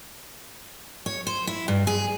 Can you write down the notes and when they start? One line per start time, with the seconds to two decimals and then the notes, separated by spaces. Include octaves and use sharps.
1.06 C#5
1.27 C5
1.47 E4
1.68 G2
1.87 G#4